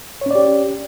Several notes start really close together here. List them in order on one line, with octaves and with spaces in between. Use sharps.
C#5 C#4 D5 G4